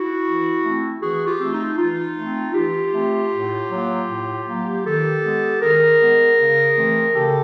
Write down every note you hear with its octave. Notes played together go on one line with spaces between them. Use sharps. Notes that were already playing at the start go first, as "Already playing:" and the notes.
Already playing: E4 F#4
E3
A3 C4
E3 F#4 G#4
F4 G4
A3 C4
D#4 F4
E3 D#4 F4
A3 C4
E3 F4 G4
A3 C4
A2
F#3 A#3
A2
F#3 A#3
D#3 G4 A4
G#3 B3
D#3 G#4 A#4
G#3 B3
C#3
E3 A3 C4
C#3 G4 A4